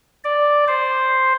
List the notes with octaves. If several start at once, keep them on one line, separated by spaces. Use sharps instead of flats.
D5
C5